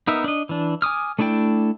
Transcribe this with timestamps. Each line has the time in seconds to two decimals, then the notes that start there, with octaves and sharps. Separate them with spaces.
0.07 B3 D#4 A#4 E5
0.24 D4 D#5
0.49 E3 D4
0.82 G#5 D6 D#6 F6
1.19 A3 D4 E4 D5 G5